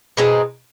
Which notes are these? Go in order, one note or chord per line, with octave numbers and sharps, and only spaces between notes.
B2 G#3 C4 D#4